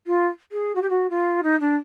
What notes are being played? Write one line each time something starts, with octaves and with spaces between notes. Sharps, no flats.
F4
G#4
F#4
G4
F#4
F4
D#4
D4